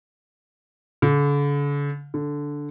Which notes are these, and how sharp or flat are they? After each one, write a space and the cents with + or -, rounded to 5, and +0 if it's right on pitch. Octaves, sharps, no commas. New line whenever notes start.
D3 -40
D3 -5